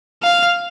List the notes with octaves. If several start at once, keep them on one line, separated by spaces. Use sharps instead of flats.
F5